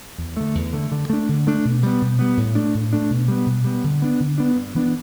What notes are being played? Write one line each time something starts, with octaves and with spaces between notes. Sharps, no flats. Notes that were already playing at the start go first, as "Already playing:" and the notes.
E2
D3 A3
E2
D3 A3
D3
A3 D4
D3
A3 D4
B2
G3 B3
B2
G3 B3
A2
A3 D4
A2
A3 D4
B2
G3 B3
B2
G3 B3
D3
B3 D4
D3
B3 D4
G2
E3 B3 D4